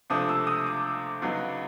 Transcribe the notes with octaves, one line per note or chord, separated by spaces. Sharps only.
C#2 C3 F3 A3 D4 D#6
E6
D#6
D6
E2 C#3 F#3 B3 D#4